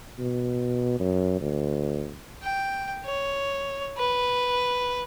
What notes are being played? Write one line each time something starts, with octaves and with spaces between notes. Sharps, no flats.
B2
F#2
D2
G5
C#5
B4